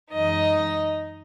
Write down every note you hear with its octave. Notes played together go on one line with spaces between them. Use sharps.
F#2 E3 G#3 D#4 D#5